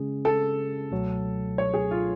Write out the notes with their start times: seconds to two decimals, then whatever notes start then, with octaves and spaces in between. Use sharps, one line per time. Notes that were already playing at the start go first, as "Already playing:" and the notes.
Already playing: C#3 G#3 C#4 G#4
0.25 A4
0.92 C#2 B2 F#3 A3
1.58 C#5
1.74 G#4
1.91 F4